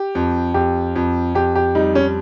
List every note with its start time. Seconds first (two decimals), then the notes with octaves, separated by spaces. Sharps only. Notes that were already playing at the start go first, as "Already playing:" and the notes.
Already playing: G4
0.15 F2
0.54 F2 G4
0.95 F2
1.35 F2 G4
1.55 G4
1.75 G3 D#4
1.95 C#4